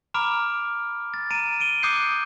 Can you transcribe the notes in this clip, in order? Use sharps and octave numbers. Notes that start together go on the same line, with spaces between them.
A#5 B5 D6 F6 D7
A6
A#5 D7 D#7
D7 D#7 G7
D6 D#6 F#6 G6 C7 C#7